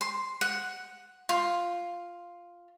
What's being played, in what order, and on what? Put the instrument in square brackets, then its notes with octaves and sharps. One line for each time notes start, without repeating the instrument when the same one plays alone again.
[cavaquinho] C6
F#5
F4